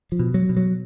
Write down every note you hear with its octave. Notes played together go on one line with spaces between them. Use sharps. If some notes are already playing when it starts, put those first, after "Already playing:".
F3
B2
F#3
B2
F#3